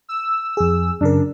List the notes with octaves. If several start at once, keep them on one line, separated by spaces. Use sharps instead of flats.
E6
F2 G#4
F#2 C#3 D4 A#4